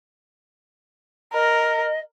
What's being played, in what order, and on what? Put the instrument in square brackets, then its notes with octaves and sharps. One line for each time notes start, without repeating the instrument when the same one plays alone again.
[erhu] A#4 [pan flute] D#5